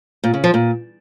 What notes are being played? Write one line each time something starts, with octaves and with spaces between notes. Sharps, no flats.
A#2
C#3
F3
A#2